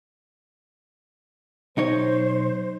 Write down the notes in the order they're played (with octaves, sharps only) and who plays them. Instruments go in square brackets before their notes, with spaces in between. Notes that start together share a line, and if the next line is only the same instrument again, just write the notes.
[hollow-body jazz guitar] B1 D#4 C#5 [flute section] C5